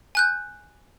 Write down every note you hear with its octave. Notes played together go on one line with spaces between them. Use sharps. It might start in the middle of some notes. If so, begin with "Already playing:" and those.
G#5 F#6 G6